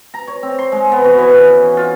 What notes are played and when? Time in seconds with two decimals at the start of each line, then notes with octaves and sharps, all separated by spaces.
0.14 A#5
0.28 C#5
0.43 C4
0.59 C6
0.72 G#3
0.92 B3
1.04 F#4
1.18 E3
1.33 C#4
1.77 F4